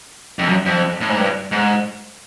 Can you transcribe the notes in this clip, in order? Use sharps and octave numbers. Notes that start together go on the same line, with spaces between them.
F2
F#2
F2
A2
G#2
G2
G#2